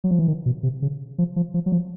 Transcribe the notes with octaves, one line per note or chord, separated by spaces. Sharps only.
F#3
F3
E3
D#3
B2
C3
C#3
F3
F3
F3
F#3
F3